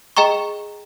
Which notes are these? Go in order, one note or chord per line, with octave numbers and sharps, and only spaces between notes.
G#4 D#5 G5 A#5 C#6